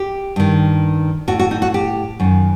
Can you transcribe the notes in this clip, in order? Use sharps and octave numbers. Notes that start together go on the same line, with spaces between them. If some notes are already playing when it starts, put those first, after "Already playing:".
Already playing: G4
G2 D#3
A2 F#4
F#4
D#4
F#4
G4
F#2 D#3